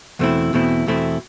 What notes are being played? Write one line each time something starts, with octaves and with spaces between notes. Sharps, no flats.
E2 B2 A3 C4 E4
E2 B2 A3 C4 E4
E2 B2 A3 C4 E4